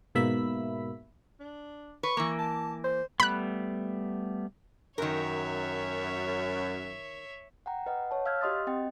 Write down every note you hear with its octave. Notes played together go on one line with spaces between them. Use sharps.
G#2 B2 A#3 E5 B5 B6
D4
B4 C#6
E3 A#3
A5
C5
G3 A3 B3 B5 F#6
F#2 D#3 A#4 C#5 E5
F#5 G5 A#5
B4 D#5 F#5
C#5 A5
F5 E6 F6 G6 G#6
F#4 G4 D#5 C6 D#6 A6
C4 D#5 G5